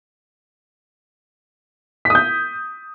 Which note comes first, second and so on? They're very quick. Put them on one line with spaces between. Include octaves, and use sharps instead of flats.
B6 D#6 G6